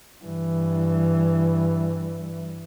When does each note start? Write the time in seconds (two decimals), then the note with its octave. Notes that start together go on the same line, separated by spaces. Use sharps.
0.24 G2 E3